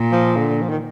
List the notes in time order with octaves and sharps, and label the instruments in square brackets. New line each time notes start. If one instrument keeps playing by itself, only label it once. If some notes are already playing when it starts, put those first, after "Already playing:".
Already playing: [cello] A#2
[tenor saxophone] F3
D3
F3
D#3